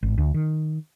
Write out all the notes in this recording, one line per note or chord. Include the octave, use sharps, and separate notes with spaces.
G#1
D2
D#3